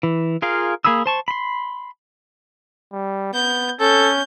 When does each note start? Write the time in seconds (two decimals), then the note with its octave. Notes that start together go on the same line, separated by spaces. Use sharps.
0.03 E3
0.42 F4 G#4 A#4 F5
0.85 A#3 G#4 B5 D#6 E6
1.06 C5 A5 C#6
1.28 B5 C6
2.93 G3
3.34 B3 G6
3.80 C#4 A4 G6